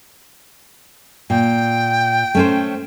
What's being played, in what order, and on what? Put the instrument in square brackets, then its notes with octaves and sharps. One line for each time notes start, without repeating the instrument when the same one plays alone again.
[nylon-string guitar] A#2 [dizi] G5
[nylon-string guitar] A3 C#4 C5